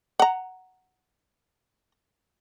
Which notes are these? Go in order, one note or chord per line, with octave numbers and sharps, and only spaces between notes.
F#5 A#5